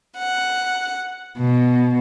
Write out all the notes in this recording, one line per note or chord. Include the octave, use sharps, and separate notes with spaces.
F#5
B2